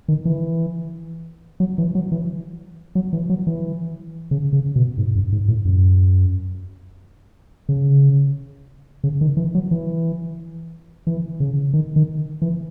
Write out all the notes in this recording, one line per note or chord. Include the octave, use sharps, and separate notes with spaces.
D#3
E3
F#3
E3
F#3
E3
F#3
E3
F#3
E3
C#3
C#3
B2
G#2
F#2
G#2
A2
F#2
C#3
C#3
D#3
E3
F#3
E3
E3
C#3
D#3
D#3
E3